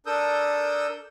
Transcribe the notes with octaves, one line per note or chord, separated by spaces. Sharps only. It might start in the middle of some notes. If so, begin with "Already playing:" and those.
D4 A4 A#4 D#6 E6 G6